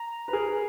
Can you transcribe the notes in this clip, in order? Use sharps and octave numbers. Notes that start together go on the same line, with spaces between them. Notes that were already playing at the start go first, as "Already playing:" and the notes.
Already playing: A#5
B4
G#4 A#4